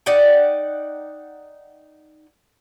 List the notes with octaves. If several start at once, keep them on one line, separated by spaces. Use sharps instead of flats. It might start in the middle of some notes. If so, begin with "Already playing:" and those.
D#4 D5 F#5 G5